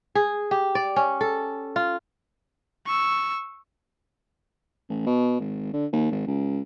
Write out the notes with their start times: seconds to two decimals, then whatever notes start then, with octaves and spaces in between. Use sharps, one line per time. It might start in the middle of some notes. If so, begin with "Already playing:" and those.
0.15 G#4
0.51 G4
0.75 D5
0.96 C#4
1.21 A4
1.76 F4
2.86 C#6 E6
4.90 A1
5.07 B2
5.40 G#1
5.73 D3
5.93 D#2
6.11 G#1
6.27 C#2